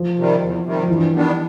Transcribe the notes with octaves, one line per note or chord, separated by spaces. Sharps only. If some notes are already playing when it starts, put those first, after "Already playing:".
Already playing: F3
C3 D#3 G3
E2
C3 D#3 G3
F3
G2 E3
D#3 G3 B3 D4